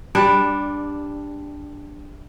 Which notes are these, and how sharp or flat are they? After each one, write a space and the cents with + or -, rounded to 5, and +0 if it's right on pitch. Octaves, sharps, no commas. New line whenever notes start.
G3 +15 D4 +0